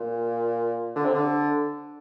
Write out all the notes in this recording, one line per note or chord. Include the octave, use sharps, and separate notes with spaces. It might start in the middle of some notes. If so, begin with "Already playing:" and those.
Already playing: A#2
D3
C3
D3